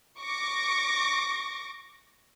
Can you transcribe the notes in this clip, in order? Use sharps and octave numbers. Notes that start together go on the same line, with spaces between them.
C#6 D6 A#6